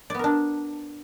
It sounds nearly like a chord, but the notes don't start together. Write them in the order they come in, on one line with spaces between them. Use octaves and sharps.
D5 B3 A#4 D4